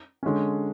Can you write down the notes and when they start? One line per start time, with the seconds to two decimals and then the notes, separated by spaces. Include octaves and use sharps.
0.23 D3 G#3 C#4